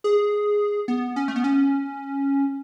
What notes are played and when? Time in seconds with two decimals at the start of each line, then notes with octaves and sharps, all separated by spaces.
0.04 G#4
0.88 B3
1.16 C#4
1.28 A3
1.36 B3
1.44 C#4